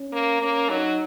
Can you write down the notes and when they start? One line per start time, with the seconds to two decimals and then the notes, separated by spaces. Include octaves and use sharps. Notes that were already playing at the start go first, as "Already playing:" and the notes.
Already playing: C#4
0.12 A#3
0.41 A#3 C#4
0.69 F#3 D#4